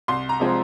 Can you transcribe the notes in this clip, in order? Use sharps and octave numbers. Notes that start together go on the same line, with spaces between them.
C2 C6
A#5
C3 F3 G#3 C4